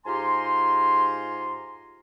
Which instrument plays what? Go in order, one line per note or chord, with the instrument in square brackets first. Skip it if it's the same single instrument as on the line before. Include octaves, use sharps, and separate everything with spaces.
[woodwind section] G#2 F4 G4 G#5 A#5 C6